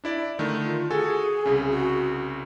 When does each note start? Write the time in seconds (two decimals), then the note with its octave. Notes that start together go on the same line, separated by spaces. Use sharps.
0.04 D4 E4 D5
0.39 D3 D#3 A3 A#4
0.64 F4
0.91 F#4 G#4 A4 G#5
1.45 C2 C#3
1.70 F#4